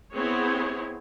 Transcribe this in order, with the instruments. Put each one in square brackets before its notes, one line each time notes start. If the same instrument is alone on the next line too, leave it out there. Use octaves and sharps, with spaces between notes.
[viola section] B3 C4 E4 G#4 C#5